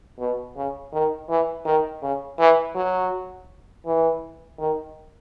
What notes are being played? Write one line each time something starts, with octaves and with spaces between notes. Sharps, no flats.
B2
C#3
D#3
E3
D#3
C#3
E3
F#3
E3
D#3